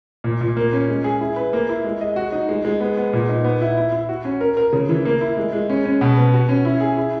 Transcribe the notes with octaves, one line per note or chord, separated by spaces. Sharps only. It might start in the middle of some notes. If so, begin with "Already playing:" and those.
A#2
A#2
A#3
C#4
G#3
G#4
E4
B4
A#3
E4
G#3
D#5
F#4
D#4
G#3
G#3
B3
B3
A#2
D#4
B3
E4
E4
E4
F#4
C#4
A#4
A#4
C#3
E3
A#3
E4
G#3
G#3
C#4
C#4
B2
B3
F#4
C#4
E4
G#4
E4